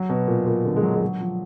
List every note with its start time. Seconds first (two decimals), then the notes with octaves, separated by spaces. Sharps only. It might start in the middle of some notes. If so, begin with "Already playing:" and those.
Already playing: F#3
0.09 B2
0.28 A#2
0.46 A#2
0.65 D3
0.76 G#3
0.83 F#3
0.96 G#3
1.02 F#3
1.20 F3